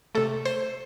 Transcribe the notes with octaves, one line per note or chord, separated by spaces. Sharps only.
C3 A3 A4
C5